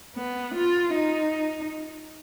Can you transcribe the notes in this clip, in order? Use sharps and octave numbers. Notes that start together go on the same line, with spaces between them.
B3
F4
D#4